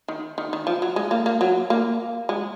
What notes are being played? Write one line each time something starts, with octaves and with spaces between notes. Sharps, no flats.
D#3
D#3
D#3
F3
F#3
G#3
A#3
A#3
F#3
A#3
G#3